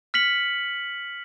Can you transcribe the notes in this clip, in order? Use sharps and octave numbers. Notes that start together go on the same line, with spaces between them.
F6 B6 C#7 F#7